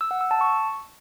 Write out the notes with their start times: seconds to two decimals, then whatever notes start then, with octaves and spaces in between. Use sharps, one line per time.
0.01 E6
0.11 F#5
0.21 E6
0.31 A5
0.41 C#6